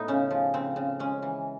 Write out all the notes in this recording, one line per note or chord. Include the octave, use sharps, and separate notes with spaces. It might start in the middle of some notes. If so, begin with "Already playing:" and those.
Already playing: A2 B3 D#4
C#3 C#4
F3
C#3 C4
C#3
G#3 C#4
E3